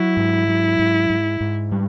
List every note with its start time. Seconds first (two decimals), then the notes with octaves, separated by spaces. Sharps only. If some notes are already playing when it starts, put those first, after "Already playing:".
Already playing: F#3 E4
0.17 G#2
0.48 F#3
0.79 G#2
1.10 G#2
1.41 G#2
1.72 G3